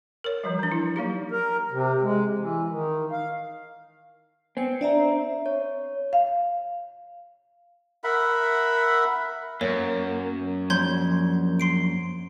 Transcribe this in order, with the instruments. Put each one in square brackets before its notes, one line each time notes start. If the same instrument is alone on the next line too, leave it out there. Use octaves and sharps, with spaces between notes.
[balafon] A#4 C#5
E3 F3 G3
E3 D4
E4
F#3 A#3 D#4 G4
[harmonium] A#4
C3
G#3
E3
D#3
F5
[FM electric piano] B3 G#5 C#7 [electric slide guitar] C4
[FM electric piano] D4 [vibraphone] D5 E5 A#5
[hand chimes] C#5
[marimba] F5
[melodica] A#4 E5 F#5 B5
[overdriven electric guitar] F#2 [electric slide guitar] A#3 [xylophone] C#5
[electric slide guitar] F3 A#3 C#5 [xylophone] C6 G6 G#6
[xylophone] C6 C7 D7